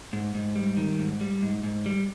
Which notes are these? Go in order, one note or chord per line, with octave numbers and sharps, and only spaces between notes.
G#2
G#2
G3
D#3
G#2
G3
G#2
G#2
G3